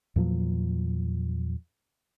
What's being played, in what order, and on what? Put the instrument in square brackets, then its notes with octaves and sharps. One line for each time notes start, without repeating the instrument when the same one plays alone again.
[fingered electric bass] E2 A#2 F3 F#3